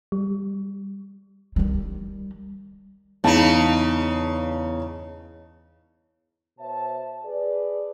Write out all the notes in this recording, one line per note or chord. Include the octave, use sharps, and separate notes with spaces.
G3
D#3 G3
E2 C#3 D#4 A5
B2 C5 C#5 E5 A5
G#4 B4 D5